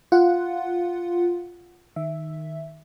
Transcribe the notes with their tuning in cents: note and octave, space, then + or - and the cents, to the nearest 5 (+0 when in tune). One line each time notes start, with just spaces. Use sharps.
F4 +0 F#5 +0
D#3 +0 E5 +0